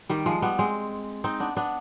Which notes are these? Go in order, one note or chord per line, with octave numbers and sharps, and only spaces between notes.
D#3 G3
F3 G#3
G3 B3
G#3 C4
C4 D#4
B3 D4
B3 D4